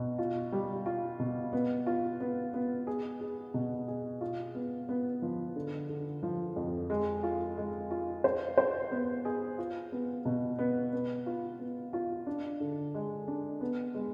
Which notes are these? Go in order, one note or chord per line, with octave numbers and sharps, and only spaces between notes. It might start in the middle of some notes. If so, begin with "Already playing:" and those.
Already playing: B2
F4
G3
F4
B2
B3
F4
B3
B3
G#4
G#4
B2
G#4
F4
B3
B3
F3
D3
D3
F3
F2
G#3
F4
G#3
F4
C5
C5
B3
G#4
F4
B3
B2
B3
B3
F4
B3
F4
D4
D3
G#3
D4
B3
G#3